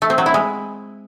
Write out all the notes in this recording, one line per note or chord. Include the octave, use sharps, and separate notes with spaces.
A3
C4
F#3
E4
G#3